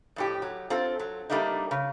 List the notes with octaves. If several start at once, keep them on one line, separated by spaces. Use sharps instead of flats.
F2 A2 G4
F#3
C4 F4 A4
F#3
G3 A3 A#3 D4 D#4
C#3